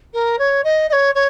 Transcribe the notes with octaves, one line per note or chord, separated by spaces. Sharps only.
A#4
C#5
D#5
D#5
C#5
C#5